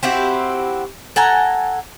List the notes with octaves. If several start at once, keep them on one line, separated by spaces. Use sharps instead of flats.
C4 E4 F#4 G4
A4 F#5 G#5 A#5